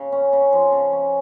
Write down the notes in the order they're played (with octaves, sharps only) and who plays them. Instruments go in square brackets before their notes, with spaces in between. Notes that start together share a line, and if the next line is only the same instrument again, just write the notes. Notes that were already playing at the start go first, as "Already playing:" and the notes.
Already playing: [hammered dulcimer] C#3
C#4
C#3
F3
C#3
C#4